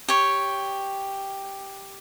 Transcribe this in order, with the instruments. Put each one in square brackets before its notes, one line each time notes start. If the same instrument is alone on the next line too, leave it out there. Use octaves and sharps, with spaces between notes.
[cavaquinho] G4 C#5